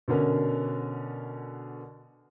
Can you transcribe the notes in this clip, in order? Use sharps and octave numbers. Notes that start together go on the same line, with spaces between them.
B2 D3 C#4 A#4